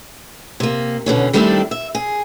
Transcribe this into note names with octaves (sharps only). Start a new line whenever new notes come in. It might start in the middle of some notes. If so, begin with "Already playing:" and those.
C3 A#3
D#2 B2 D3 C#4
D#3 G3 A3 C4 D4 E4
E5
G#4